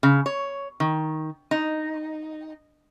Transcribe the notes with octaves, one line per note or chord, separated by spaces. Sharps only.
C#3
C#5
D#3
D#4